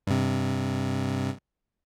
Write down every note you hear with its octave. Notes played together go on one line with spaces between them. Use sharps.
G2 C3